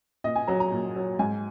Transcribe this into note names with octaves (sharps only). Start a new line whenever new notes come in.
A#2 D#5
G#5
F#3 A#5
A#5
A#2
F#3
G#2 G#5